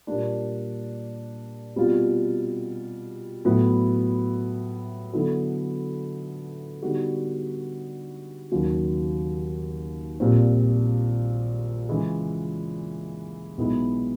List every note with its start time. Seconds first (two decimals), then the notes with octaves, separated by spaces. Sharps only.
0.07 A#2 G3 A#3 D4
1.76 B2 G3 C4 F4
3.45 A2 F#3 B3 E4
5.13 D3 F#3 B3 E4 A4
6.82 D3 G3 B3 D#4 F#4
8.52 D#2 C#3 F#3
10.20 A#1 A#2 G3 C4
11.89 C#3 E3 G#3
13.57 B1 B2 G#3 B3 E4